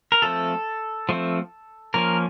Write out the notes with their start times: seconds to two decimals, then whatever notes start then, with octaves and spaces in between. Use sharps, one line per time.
0.12 A#4
0.22 F3 A3 C4 A4
1.09 F3 A3 C4
1.94 F3 A#3 C#4 A#4